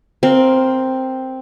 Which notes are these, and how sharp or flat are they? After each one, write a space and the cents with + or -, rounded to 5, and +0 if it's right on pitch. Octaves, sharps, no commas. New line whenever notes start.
C4 +0 A#4 +0 F5 +15